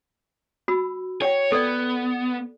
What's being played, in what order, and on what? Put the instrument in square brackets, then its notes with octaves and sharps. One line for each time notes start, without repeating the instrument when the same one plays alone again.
[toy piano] F#4 B5 E6
[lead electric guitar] C#5 [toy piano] F#5 G5
[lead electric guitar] B3 [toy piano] A4 D5